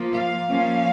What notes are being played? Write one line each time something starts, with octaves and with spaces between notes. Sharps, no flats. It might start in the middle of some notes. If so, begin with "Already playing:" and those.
Already playing: F3 A#3 F4
F5
F3 A#3 C#4